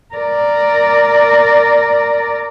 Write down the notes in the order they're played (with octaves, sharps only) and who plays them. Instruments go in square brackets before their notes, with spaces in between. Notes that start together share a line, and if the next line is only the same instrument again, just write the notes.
[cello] A#4 D5